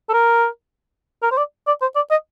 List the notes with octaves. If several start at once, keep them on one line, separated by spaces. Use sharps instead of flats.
A4
A#4
A#4
C5
D5
D5
C5
D5
D#5